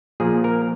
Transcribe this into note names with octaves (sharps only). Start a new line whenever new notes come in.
A#2 F3 A#3 G#4
A#4